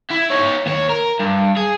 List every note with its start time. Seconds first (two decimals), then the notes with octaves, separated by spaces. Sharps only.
0.11 E4
0.31 D#4 C#5
0.66 D#2 C#5
0.89 A#4
1.19 G2
1.57 G#4